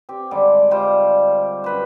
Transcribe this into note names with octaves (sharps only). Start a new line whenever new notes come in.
C4 G4
D3 G3 G#3 D5
G3 F4 C5 G5
F#2 B4 C5